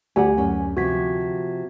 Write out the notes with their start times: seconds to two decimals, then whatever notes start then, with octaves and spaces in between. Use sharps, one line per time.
0.16 D2 G4 F#5 G#5
0.37 F#2 C#4
0.77 C3 F3 F#4 G#6 B6